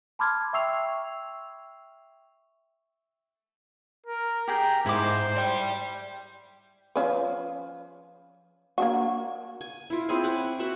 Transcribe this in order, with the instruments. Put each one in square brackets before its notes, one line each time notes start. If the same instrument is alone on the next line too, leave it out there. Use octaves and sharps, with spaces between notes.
[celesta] A5 B5 C6 D6 F6 G#6
E5 G5 C#6 E6 C7 F7
[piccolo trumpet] A#4
[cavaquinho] G4 G#4 G5 [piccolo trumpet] A#5
[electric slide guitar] G#2 [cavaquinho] E4 D6 [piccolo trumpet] C5
[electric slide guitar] D5 G5
[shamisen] F3 C#4 B4
A#3 D4 F#4
[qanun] G#5
E4 F4
C4 E4 G#4 C#5
F#5 G#5 D6
F#4 E5 F#5